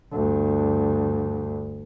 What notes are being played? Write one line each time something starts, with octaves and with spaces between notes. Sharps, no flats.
D2 G2